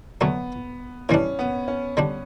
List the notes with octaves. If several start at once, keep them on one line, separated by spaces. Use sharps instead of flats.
D3 F#3 A3 B3 C#4
A2 E3 G3 C#4 D4
B3
C#4
D3 G3 D4